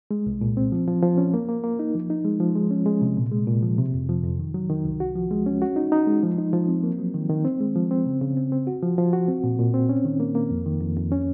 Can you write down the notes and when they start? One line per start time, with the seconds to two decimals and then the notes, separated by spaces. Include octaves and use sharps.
0.11 G#3
0.26 C2
0.41 A#2
0.57 C4
0.72 F3
0.88 F3
1.03 F3
1.18 C#4
1.34 A#3
1.49 A#3
1.64 A#3
1.79 D#4
1.95 F3
2.10 D#4
2.25 G#3
2.40 F3
2.55 G#3
2.71 C#4
2.86 G#3
3.01 C3
3.17 A#2
3.32 G#3
3.47 A#2
3.62 F3
3.78 C3
3.94 F2
4.09 F3
4.24 F2
4.39 D#3
4.54 F#3
4.70 D#3
4.85 C2
5.00 F#4
5.15 F3
5.31 G#3
5.46 C#4
5.62 F#4
5.76 D#4
5.92 D#4
6.07 G#3
6.23 F3
6.38 D#4
6.53 F3
6.68 C4
6.83 A#3
6.99 F#3
7.14 D#3
7.30 D#3
7.45 C4
7.60 G#3
7.76 F3
7.91 C4
8.06 C#3
8.21 C#3
8.37 C4
8.52 C4
8.67 F#4
8.82 F3
8.98 F3
9.13 F#4
9.28 C4
9.44 A#2
9.59 A#2
9.74 C4
9.89 C#4
10.05 D#3
10.20 A#3
10.35 A#3
10.51 F2
10.66 D#3
10.81 F2
10.96 F2
11.12 C#4